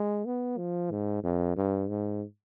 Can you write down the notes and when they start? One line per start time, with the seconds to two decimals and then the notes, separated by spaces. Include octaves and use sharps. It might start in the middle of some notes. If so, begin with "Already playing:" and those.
Already playing: G#3
0.26 B3
0.58 F3
0.91 G#2
1.24 F2
1.57 G2
1.89 G#2